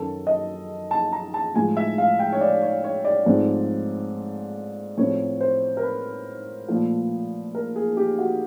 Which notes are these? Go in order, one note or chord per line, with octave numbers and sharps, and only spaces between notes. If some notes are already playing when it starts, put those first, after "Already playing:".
Already playing: F#2 D#3 F#3 A4
D#5
A5
A#5
A5
A2 F3 G#3 G#5
E5
F5
G5
C#5
D5
C#5
C#5
D5
G#2 F3 A3 C4
A2 F3 A3 C4 C#5
C5
A#4
B4
A#2 F3 A3
A#4
G#4
G4
F#4